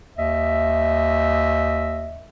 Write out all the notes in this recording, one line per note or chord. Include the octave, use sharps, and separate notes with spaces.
D#2 D#5 E5